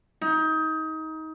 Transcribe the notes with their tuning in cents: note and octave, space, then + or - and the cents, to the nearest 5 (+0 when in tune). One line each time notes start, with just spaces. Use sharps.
D#4 +25